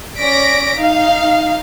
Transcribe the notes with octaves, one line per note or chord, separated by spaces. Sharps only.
C#4 D5 A#6 B6 D7
D#4 F5